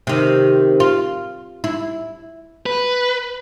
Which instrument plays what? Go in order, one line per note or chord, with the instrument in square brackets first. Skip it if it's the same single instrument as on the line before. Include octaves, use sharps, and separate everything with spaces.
[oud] C3 D#3
F4
E4
[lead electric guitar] B4